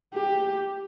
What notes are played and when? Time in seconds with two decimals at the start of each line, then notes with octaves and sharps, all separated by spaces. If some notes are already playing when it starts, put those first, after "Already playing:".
0.14 G4